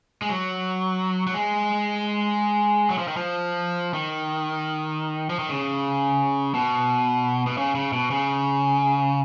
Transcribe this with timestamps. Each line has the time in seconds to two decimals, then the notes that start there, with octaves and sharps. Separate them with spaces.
0.22 G#3
0.30 F#3
1.27 F#3
1.34 G#3
2.90 F#3
2.98 F3
3.08 D#3
3.17 F3
3.94 D#3
5.30 F3
5.39 D#3
5.49 C#3
6.54 B2
7.47 B2
7.58 C#3
7.75 C#3
7.93 B2
8.11 C#3